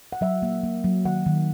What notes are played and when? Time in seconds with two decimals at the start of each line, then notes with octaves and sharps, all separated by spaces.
0.13 F#5
0.21 F#3 E5
0.42 A#3
0.64 A#3
0.84 F#3
1.05 D#3 F#5
1.26 D#3